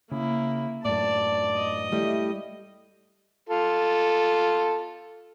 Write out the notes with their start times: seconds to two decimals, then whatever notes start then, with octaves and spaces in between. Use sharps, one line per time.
0.11 C#3 A#3 E4
0.85 F#2 A2 D5 A5
1.56 D#5
1.92 G3 A3 E4
3.49 F4 A4